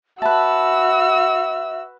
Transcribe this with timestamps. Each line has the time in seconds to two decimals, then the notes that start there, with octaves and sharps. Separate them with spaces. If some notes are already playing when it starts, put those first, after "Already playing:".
0.22 F#4 B4 E5 A5 E6